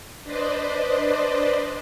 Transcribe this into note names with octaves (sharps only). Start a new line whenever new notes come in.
D4 B4 C5 D5 D#5